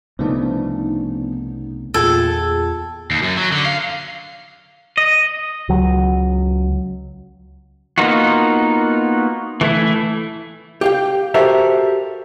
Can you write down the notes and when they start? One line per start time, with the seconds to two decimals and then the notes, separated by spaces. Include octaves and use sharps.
0.19 C2 C#3 F3 A3 B3 D4 D#4
1.94 E2 A#2 F4 G#4 A4 G5 G#6
3.11 D#2
3.23 F#2
3.37 F#3
3.52 D3
3.66 F5
4.98 D#5
5.69 C#2 F#3
7.98 A#3 B3 D#4 F4 F#4
9.61 E3 A3 E4
10.81 G4 F5 G5
11.34 F#4 G4 A4 A#4 C5 E5